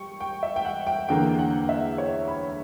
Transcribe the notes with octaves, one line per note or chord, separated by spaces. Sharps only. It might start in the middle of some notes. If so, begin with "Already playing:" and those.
Already playing: G3 G5 C#6
G5
E5
G5
F#5
G5
E2 D3 A#3 G5
F#5
E5
C#5
B5